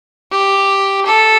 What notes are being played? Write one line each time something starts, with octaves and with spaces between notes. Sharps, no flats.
G4
A4